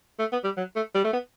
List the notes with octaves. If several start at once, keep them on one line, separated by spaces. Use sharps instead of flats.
A3
B3
G3
F#3
A3
G3
A3
B3